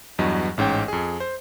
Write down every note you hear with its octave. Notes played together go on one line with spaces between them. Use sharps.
E2 G2 F#3 D#5
A1 G#2 C#4 G5
F2 G#4
C5